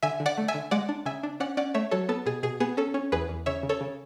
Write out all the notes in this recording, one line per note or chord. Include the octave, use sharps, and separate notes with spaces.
D3 E5 G#5
D3
D5 F#5
A3
E5 G#5
D3
G#3 D5 F#5
D4
C#3 E5 G#5
D4
C#4 D5 F#5
C#4 D5 F#5
A3 C#5 E5
F#3 A4 C#5
B3 A4
B2 G#4
B2 G#4
B3 G#4
C#4 A4
C#4
E2 G#4 B4
E2
C#3 C#5 E5
C#3
A4 C#5
C#3